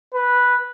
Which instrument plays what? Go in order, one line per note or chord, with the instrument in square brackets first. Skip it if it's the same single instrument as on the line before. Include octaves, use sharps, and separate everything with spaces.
[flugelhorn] B4